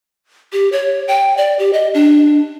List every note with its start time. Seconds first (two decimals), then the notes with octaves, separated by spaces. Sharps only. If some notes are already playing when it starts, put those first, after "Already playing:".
0.53 G4
0.72 C#5
1.08 G5
1.37 D5
1.59 G4
1.73 D#5
1.94 D4